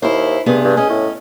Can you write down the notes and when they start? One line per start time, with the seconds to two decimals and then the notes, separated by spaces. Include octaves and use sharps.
0.02 D#2 E4 C5
0.46 G2 C3 B3 G#4
0.64 G2
0.77 C#4 G#4 D#5
0.89 A2